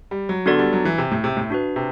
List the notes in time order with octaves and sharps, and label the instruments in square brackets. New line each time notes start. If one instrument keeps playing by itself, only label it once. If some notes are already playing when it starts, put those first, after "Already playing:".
[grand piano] G3
F#3
[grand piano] D3 [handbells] B3 D4 F#4 A4 D5
[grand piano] G3
F#3
E3
C3
A2
C3
A2
[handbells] D4 F#4 B4
[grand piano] C3